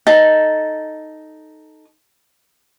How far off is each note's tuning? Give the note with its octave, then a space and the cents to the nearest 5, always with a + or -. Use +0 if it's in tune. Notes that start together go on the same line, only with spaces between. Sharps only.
D#4 +0 A4 +0 A5 +0